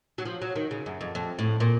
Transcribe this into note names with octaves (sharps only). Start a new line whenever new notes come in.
F#3
F3
F#3
D#3
C#3
F#2
F2
F2
A2
A#2